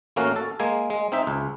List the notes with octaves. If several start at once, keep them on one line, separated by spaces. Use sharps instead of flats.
A1 A3 A#3 C#4 F#4 F5
A4
G#3 A#3 G#5
G#3
C4 D#4 E5
C#2